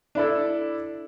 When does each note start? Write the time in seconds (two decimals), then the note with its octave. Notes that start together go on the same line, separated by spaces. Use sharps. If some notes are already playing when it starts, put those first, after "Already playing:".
0.15 D4 E4 A4